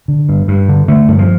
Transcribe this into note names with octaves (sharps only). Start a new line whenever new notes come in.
D3
G2
G2
D3
D3 A3
G2
F3